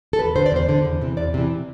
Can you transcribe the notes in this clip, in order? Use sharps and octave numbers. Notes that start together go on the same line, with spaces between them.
A4
E2 B4
D3 C5
D5
E2 C5
D3
E2
C3 E3
E2 D5
C3 E3